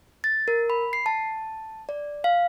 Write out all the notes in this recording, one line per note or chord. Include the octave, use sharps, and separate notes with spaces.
A6
A#4
B5
C7
A5
D5
F5